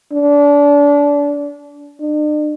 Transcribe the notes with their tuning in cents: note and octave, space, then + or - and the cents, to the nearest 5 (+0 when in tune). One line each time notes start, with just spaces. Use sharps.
D4 -25
D4 +45